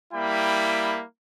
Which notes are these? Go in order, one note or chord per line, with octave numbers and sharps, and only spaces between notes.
G3 A#3 E4 G5 B5